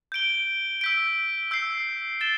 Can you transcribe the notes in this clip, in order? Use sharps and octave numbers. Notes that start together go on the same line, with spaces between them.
G6 D7 G7
E6 G6 B6 D7
E6 G6 C7
A6 E7 G7